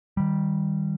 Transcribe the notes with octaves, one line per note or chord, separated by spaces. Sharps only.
D#3 G3